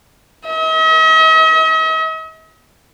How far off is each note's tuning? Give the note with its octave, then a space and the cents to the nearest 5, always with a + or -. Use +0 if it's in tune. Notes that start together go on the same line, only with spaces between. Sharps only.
D#5 +45